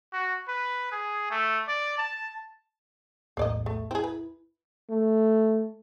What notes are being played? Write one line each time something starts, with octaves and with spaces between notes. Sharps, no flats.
F#4
B4
G#4
A3
D5
A5
B1 E2 A2 A#3 D5 D#5
A3
C4 E4 G#4
B4
A3